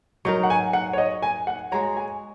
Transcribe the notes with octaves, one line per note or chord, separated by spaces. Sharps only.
F#3 D#4 A#4 C#6
F#5
G#5
F#5
C#5
D#5
G#5
F#5
G#3 F#4 C#5 A#5
G#5